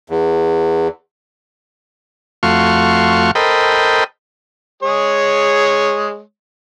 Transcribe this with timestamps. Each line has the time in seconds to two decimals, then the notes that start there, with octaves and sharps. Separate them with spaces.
0.10 E2
2.43 F2 A3 F#4 F5 C6 C#6
3.35 A4 A#4 C5 D#5 G5 B5
4.83 G#3 G#4 C#5